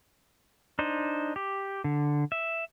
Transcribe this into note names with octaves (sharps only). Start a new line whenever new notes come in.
D4 D#4 C5
G4
D3
E5